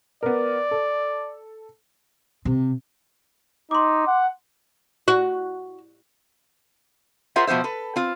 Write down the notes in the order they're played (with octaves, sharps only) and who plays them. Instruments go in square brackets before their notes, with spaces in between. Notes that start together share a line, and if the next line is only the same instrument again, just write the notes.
[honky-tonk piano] B3 A#4 [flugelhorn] D5
[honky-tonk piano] A4
[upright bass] C3
[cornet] D#4 [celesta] C6 D6
[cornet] F#5
[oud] F#4
[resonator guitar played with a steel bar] F4 G#4 A#4 C5 E5 F#5
B2 F3 B3 C5 E5
A4 B4
C4 F4